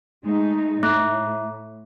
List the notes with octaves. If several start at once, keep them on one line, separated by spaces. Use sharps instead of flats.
G#3 A3 D#4
A2 A3